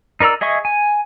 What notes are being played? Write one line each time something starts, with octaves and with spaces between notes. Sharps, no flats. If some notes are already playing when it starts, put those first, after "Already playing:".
D#4 A#4 D5 A#5 E6
G#4 D#5 E5 C#6
G#5